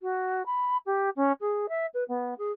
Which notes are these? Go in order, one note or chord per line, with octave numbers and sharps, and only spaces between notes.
F#4
B5
G4
C#4
G#4
E5
B4
B3
G#4